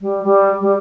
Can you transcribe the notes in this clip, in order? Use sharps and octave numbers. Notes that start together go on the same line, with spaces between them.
G3
G3
G3